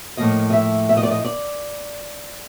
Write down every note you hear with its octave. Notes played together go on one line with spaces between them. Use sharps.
A2 F3 A#3 D#5
D#5
E5
E5
D#5
D5
D#5
D5